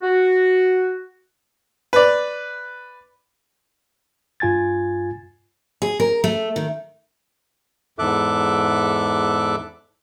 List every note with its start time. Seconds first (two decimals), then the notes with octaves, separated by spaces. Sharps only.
0.03 F#4
1.93 B4 D5
4.40 G2 F4 G#5 G#6 A6
5.82 G#4
6.00 A#4
6.24 A3
6.56 D#3
7.99 E2 G#2 A4 E5 D6 F#6